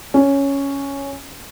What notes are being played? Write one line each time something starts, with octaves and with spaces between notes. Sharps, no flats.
C#4